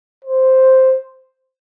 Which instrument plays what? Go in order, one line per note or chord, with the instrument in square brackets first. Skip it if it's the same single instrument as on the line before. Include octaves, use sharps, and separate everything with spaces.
[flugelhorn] C5